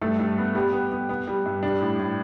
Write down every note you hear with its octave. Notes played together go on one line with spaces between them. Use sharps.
G2 A3 A4
G2
B3
G3 B3 G4
B3
B3
B3
G3
G2
G3 D4
A2
A2